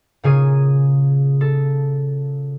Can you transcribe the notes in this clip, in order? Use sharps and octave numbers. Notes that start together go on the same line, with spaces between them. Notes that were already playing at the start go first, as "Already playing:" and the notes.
A#2 C#3 G#4 D#7
A4